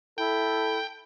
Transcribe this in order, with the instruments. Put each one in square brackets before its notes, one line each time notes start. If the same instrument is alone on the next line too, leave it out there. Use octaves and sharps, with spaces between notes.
[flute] E4 [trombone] A4 [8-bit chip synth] G5